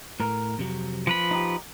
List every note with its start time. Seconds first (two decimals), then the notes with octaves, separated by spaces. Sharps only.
0.20 A2 A#4
0.58 F2 C3 F#3
1.07 F3 B4 B5
1.31 D#4 G4